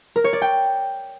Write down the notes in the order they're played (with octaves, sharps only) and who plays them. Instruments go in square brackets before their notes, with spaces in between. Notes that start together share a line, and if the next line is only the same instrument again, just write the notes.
[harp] A#4
C#5
D5
G5